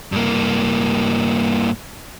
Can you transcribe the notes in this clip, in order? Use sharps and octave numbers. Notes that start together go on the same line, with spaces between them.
G2 A#3